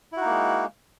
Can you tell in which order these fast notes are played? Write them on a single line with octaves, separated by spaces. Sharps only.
E4 F#4 D#4 A#3 G#3